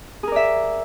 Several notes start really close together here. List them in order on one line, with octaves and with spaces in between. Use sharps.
G#4 A#4 D5 E5